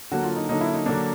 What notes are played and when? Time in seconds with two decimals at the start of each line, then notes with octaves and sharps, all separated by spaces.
0.11 D3 F#3 A#3 F#4
0.23 F4
0.36 D#4
0.49 D3 F#3 A#3 D#4
0.61 E4
0.74 D#4
0.86 D3 F#3 A#3 D4